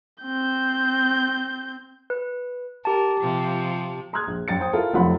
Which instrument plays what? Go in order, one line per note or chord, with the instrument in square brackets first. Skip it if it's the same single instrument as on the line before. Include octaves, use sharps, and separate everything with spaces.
[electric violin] C4 G6
[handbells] B4
[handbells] G4 A5 [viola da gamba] A#4
[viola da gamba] C3 F3
[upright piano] A#5 C6 D#6 F6 F#6 G#6
A#1
F#2 G5 A6 C#7
C5 G5 D#6
E4 F4 A4 A#4
F1 F3 F#3 F#5 B5 C6